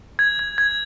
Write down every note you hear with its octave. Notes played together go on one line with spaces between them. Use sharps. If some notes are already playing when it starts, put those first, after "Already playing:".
G#6
G#6
G#6